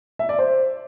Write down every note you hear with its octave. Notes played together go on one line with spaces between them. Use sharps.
E5
D5
C5